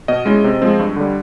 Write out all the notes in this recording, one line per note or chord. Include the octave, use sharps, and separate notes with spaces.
B2 D#5
G#3 C#4 E4
C3
F3 G#3 C4
G2
D3 G3